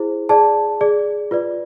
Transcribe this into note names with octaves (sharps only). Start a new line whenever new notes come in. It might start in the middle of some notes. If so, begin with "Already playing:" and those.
Already playing: E4 G#4 C5
G#4 D5 A5
G#4 D5
F4 B4 D5